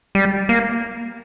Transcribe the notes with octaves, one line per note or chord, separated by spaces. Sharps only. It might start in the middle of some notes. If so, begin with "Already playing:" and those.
G3
A#3